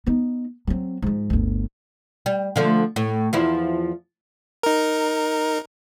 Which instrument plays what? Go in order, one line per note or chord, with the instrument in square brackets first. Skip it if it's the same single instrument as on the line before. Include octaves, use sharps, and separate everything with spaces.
[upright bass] B3 D#4
F#3 C4
G#2 F3
G1 D2
[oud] G3
D3 F3 A3
A2
E2 F3 E4
[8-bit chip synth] D#4 A#4